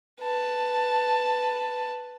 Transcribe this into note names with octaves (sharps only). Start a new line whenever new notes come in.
B4 A5